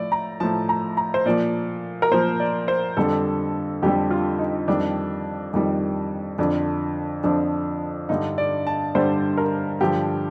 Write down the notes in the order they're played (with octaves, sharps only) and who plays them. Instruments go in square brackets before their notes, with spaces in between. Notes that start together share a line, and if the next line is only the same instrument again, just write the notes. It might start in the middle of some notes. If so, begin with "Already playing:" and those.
Already playing: [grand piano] A2 F3 D5
A#5
A2 F3 A5
A#5
A#5
C5
A#2 F3 D5
A#4
A#2 F3 C5
D5
C5
F2 D3 G3 A4
F2 D3 G3 G4
F4
D#4
F2 D#3 G3 D4
F2 D#3 G3
F2 D3 F3 D4
F2 D3 F3 D4
G2 D3 G3 D#4
D5
A5
G2 D3 G3 C5
A#4
G2 D3 F3 G4